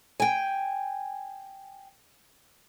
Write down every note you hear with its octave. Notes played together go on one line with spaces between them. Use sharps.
G5 G#5